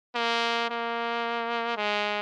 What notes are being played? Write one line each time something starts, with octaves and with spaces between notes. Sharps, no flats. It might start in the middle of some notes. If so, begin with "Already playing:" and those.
A#3
A#3
G#3